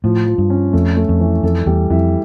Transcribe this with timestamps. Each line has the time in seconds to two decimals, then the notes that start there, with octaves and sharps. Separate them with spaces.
0.04 A2 F3
0.26 F3
0.38 G2
0.50 C#4
0.73 F2 A3
0.97 A3
1.09 F2
1.20 E3
1.43 F2 A4
1.66 E2 G3
1.90 F2 E4